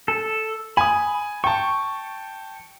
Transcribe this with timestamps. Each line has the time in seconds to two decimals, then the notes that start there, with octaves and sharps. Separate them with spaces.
0.08 A4
0.77 G#5 B5 D#6
1.44 G5 A5 C#6